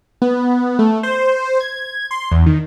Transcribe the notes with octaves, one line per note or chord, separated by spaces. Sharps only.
B3
A3
C5
G#6
C6
E2
D#3